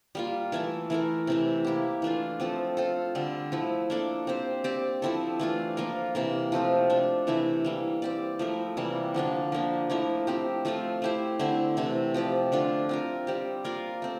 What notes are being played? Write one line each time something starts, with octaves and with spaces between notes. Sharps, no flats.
G3 A#3 F4
E3 A3 E4 A4
E3 A3 E4 A#4
C3 E3 A3
A#3 E4 G4
E3 A3 D4 F4
F3 C4 F4 A4
C4 F4 A4
D3 G3 C4
F3 A3 E4
A#3 D4 A4 D5
C4 G4 C5
C4 G4 D5
F3 C4 E4 A4
E3 A3 D4 F4
F3 A#3 F4 A#4
C3 E3 A#3
F3 A3 C4 F4
A3 D4 A4
C3 E3 A3 E4
E3 G3 A#3
C4 G4 D5
F3 A3 E4 A#4
C3 E3 G3 A#3
D3 F3 A#3 D4
F3 A#3 D4
F3 A3 E4 A#4
F3 C4 G4
F3 A3 C4 F4
A3 E4 G4 C5
D3 A3 C4 E4
C3 E3 A3
F3 C4 G4 D5
D3 A3 D4 F4
C4 F4 A#4
G3 C4 G4
A#3 F4 A#4 D5
A3 C4